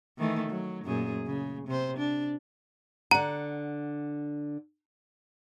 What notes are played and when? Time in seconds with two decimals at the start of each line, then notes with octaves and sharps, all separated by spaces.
0.18 D#3 E3 A3
0.49 F#3
0.85 F#2 A#2 G#4
1.26 C#3
1.68 C3 C5
1.98 D4
3.11 D3 F#5 A#5